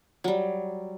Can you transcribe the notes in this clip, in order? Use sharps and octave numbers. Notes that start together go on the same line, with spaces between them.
F#3 G3